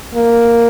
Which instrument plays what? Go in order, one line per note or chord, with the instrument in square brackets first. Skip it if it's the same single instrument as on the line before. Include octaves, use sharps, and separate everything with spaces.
[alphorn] A#3